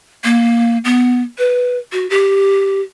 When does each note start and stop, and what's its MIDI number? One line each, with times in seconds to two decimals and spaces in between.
0.24 0.78 58
0.85 1.22 59
1.38 1.78 71
1.92 2.09 66
2.10 2.81 67